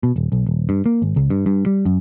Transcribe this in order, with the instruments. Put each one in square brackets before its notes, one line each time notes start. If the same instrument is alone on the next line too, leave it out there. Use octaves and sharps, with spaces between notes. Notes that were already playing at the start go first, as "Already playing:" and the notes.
[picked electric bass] B2
D#1
B1
D#1
G2
A#3
G#1
C#2
G2
G2
G3
F#2